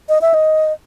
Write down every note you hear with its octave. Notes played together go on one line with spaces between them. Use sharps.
D#5
E5
D#5